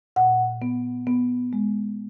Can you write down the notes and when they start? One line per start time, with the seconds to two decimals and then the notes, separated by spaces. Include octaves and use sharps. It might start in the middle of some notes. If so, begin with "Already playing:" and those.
0.16 A#2 F#5
0.62 B3
1.07 B3
1.53 G#3